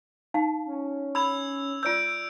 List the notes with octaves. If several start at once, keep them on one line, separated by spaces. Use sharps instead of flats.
D#4 F5 A5
C#4
B5 E6 G#6 F7
F4 D5 E6 G6 D7